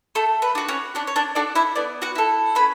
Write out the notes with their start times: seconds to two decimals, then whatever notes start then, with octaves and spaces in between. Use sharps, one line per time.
0.15 A3 A4
0.42 B4
0.55 D4 F#4
0.68 C#4 C#5
0.95 C#4 D4 D5
1.07 C#5
1.16 D4 D5
1.35 D4 F#4 A4 D5
1.55 E4 E5
1.75 B3 D4 D5
2.02 F#4 F#5
2.15 E4 A4
2.55 C#4 B4 B5